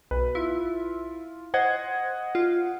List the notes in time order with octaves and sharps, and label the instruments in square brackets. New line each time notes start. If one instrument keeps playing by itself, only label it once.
[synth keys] B1 [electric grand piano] B4
[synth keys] E4 [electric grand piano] F4
[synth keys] C5 [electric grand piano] D#5 F#5 G#6
[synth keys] F4